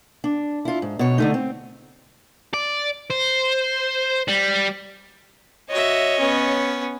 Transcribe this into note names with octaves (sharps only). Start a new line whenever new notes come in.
D4
E4 F4
G#2
B2 C#5
D3 A3 D#4
C4
D5
C5
G3
F#4 C#5 D#5 E5
B3 C#4